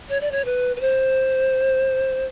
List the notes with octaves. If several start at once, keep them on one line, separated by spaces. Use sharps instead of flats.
C#5
D5
C#5
B4
B4
C5